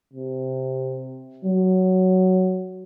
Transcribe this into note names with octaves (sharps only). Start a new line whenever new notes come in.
C3
F#3